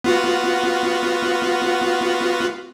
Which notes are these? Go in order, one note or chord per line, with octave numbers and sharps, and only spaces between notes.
B3 F4 F#4